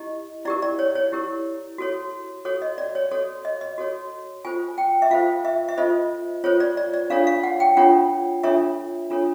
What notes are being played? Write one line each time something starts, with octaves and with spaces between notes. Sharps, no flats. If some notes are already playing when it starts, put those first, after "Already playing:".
Already playing: E4 G4 D#5
E4 G4 A#4 D5
D5
C#5
C#5
E4 G4 A#4
F#4 A4 C#5
F#4 A4 C#5
D#5
D5
C#5
F#4 A4 C#5
D#5
D#5
F#4 A4 C#5
F4 A4 C5 G#5
G5
E5
F4 A4 C5 F5
E5
E5
F4 A4 C5 D#5
F4 A4 C5 C#5
D5
D5
D5
D4 F4 A4 C#5 F5
F5
F#5
G5
D4 F4 A4 C#5 F#5
D4 F4 A4 C#5 E5
D4 F4 A4 C#5